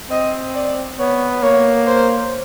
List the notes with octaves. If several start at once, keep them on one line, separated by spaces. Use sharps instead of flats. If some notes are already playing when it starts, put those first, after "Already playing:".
C4 D#5
D5
B3 C#5
A#3 C#5
C5